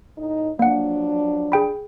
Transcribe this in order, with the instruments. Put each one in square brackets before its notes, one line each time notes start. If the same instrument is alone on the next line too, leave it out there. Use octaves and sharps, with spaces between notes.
[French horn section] A2 D#4
[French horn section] F3 F#3 D4 [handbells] A#3 F#5
[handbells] G#4 G5 B5